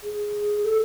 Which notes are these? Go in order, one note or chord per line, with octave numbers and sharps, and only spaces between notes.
G#4
A4